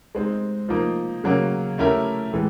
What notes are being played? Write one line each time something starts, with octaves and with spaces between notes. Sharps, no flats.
G#3 C4 D#4
F3 A#3 D#4
C#3 F#3 A#3 C#4
A3 C#4 E4 G4 A#4
A2 E3 G#3